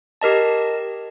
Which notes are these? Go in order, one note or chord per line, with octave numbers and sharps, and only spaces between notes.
G4 A#4 D#5 A5